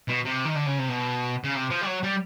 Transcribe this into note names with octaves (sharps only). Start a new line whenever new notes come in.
B2
C3
D#3
D3
C#3
C3
B2
C#3
C3
F3
G3
F#3
G3